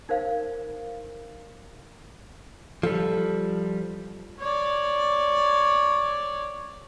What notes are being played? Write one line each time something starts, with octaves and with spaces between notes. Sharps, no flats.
D#4 A#4 C5 F5
F3 G3 A4
C#5 D5